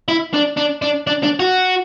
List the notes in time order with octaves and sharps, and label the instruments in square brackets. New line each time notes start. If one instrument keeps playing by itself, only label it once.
[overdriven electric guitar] E4
D4
D4
D4
D4
D4
F#4